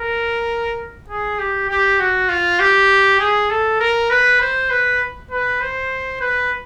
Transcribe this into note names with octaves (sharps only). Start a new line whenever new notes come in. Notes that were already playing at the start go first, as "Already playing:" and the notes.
Already playing: A#4
G#4
G4
G4
F#4
F4
G4
G#4
A4
A#4
B4
C5
B4
B4
C5
B4